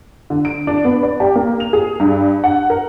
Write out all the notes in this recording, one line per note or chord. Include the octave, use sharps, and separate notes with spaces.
D3
D7
D4
B3
D5
G4
A#3
F7
G#4
G2
F#5
A#4